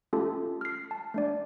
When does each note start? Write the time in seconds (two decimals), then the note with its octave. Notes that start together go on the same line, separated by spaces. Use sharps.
0.13 A3 C#4 F4 G4 A4 A5
0.61 F6 C7
0.91 A5
1.14 A3 D4 D5